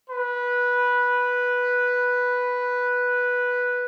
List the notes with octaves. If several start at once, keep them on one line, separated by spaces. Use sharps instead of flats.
B4